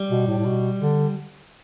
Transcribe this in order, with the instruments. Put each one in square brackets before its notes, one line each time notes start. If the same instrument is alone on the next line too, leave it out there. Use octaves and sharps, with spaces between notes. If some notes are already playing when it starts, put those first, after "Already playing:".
Already playing: [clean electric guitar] G3
[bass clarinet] B2
A2
A2
B2
D3